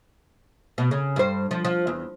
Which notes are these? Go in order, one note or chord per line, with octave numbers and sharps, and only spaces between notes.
B2
C#3
G2 C5
F3
F3
E2